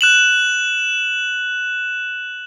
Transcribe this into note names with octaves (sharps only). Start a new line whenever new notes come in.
F#6 E7 F#7